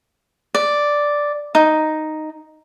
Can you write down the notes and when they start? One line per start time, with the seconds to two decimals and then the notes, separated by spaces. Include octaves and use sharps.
0.54 D5
1.55 D#4